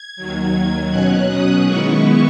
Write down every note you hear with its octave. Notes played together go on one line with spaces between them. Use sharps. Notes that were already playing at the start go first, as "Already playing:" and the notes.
Already playing: G#6
D#2 D#3 F#3
B2 F#3 C#4 F#6
D#6
D#3 G#3 B3 E4 C#6